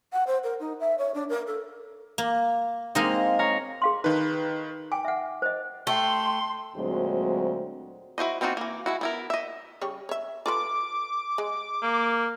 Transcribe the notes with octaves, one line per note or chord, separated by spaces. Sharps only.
F#5
C5
A#4
D#4
E5
C#5
D4
A#4
A4
A#3
G#3 A#3 C4 D#4 D#5 F5
C#5 F5 A#5
G#4 F5 C6
D#3 D#4 B4
G5 G#5 D6
E5 F#5
C5 D#5
A3 G5 C6 G7
D2 A#2 F#3 G#3 C4
E4 F#4 C5 D#5
A#3 C4 D#4 F4 F#4
E3 A#3
G#3 E4 F#4
B3 E4 A#4
D#5 E5
C#3 G3 C#5
C#5 E5
F4 A4 B4 D6
G#3
A#3